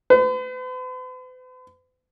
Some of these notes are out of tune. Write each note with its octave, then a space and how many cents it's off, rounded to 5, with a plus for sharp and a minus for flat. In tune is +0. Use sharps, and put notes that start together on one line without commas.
B4 +45